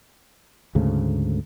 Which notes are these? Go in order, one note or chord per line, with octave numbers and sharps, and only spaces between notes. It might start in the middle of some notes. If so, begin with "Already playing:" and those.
D2 G#2 C#3 A3